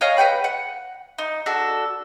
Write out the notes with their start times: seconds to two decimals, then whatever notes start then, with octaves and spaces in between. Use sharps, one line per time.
0.01 C#5 D#5 F5 G#5
0.17 B4 F#5 G5 B5
0.44 F#5
1.18 D#4
1.46 D4 F#4 A4